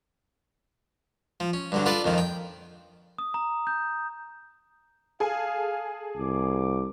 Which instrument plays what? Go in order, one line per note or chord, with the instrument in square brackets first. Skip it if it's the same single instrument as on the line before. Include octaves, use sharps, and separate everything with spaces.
[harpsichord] F3
C#4
G2 D3 F#3
D4 F4 A4 B4 D5
F2 D#3 F3
G5
[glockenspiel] D#6
A#5
G6
[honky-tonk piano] G#4 A4 G#5 [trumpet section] F5
[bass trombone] C2 [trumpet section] D6